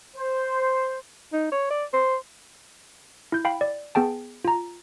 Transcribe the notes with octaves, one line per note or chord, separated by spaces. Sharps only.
C5
D#4
C#5
D5
C5
E4 G6
F5 G5 B5
D5
B3 G#4 G5 A5
F4 A#5